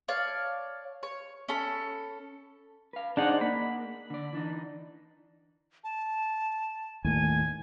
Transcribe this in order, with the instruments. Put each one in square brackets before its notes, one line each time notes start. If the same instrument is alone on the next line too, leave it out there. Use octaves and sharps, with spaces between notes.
[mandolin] C#5 D5 F5 A5
C#5
C#4 A4 B5
[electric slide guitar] B4 F5
[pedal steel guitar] D4 D#4 F#5 [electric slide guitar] G#4 C5 D#5
[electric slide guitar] A#3 [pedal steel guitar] B5
[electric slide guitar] D3 D5
E3 D4 D#4
[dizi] A5
[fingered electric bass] D#2 A2 [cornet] G#5